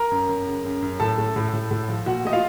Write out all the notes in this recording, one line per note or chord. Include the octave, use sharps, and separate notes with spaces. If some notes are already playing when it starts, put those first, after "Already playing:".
Already playing: A#4 A#5
F#2
F#2
C#3
F#2
F#2
A2 A4 A5
A3
A2
A2
A2
F3
A#2 F#4 F#5
A3 D#5
F4 F5